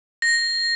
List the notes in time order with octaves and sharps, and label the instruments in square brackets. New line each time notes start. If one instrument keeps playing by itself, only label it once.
[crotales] A#6